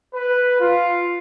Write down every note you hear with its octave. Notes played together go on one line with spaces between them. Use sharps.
B4
F4